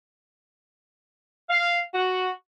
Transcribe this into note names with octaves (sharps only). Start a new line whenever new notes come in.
F5
F#4